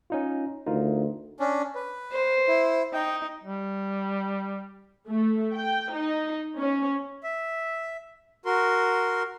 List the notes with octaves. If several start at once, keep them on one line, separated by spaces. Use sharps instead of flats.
C#4 D#4 F4
D2 D#4 F4 A#4
C#4 D4
B4
C5
E4
D#4 G5
G3
A3
G5
D#4
C#4
E5
F#4 A#4 C6